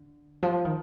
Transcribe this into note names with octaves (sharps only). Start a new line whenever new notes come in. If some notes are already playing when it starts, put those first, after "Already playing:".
Already playing: D3
F3
D#3